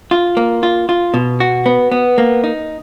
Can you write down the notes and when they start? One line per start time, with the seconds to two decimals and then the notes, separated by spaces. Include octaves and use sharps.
0.11 F4
0.37 A#3
0.63 F4
0.89 F4
1.14 B2
1.40 F#4
1.66 B3
1.92 B3
2.18 A#3
2.44 D#4